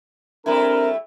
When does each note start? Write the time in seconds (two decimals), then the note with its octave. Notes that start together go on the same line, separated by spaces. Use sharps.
0.46 G3 A3 C4 D4 E4 A#4